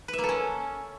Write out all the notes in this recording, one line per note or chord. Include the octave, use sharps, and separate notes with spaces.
B4
E5
A#3
A4
C#4